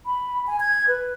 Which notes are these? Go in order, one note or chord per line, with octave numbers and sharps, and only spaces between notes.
B5
G#5
G#6
B4